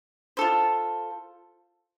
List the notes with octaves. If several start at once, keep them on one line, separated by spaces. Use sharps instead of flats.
F4 A4 C5